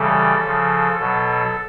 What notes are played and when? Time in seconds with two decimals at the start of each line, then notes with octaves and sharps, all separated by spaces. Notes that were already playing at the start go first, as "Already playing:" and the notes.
Already playing: C#3 E3 G3 A4
0.45 C#3 F3
0.99 B2 F#3 A4